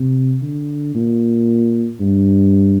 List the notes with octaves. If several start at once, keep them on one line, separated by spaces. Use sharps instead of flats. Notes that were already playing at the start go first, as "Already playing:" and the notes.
Already playing: C3
D3
A#2
G2